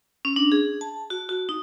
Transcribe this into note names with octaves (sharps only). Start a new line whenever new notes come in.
C#4
D4
G#4
A5
F#4
F#4
D#4